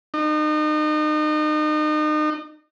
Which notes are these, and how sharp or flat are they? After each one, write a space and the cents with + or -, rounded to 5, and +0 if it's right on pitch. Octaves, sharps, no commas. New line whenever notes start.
D#4 -35